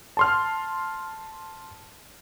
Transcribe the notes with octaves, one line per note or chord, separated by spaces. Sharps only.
A5 C6 F6